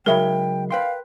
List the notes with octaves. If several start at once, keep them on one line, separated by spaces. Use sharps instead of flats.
C#3 F#3 G#3 D#4 A#4 E5 G5 B5
B4 F5 G5 C6